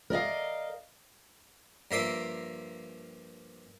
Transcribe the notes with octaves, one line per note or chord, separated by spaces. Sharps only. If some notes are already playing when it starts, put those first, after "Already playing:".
A#4 D5 D#5 F5
G2 F3 A#3 E5 C6 D6